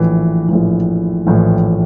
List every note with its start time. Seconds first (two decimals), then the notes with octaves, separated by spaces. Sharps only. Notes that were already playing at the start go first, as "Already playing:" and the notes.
Already playing: A#1 A2 E3
0.49 A#1 A2 E3
1.27 A#1 A2 E3